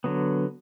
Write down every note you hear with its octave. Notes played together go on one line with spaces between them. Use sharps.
D3 F#3 B3